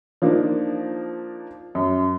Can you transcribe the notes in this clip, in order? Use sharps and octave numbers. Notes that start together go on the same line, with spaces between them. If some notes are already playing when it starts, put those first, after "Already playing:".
F3 A#3 D4 D#4
F#2